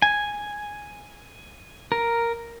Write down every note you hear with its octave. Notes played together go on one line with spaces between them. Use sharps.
G#5
A#4